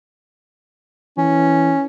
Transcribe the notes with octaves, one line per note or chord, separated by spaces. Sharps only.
E3 C#4